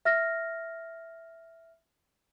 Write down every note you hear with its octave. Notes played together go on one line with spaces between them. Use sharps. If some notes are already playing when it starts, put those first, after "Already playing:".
E5 F6 A#6